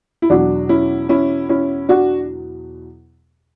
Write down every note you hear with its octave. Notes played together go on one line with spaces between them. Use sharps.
E4
E2 B2 F#3 D4 F#4
C#4 E4
C#4 E4
C#4 E4
D4 F#4